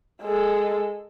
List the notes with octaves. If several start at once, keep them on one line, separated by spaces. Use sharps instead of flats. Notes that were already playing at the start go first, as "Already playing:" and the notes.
G#3 A4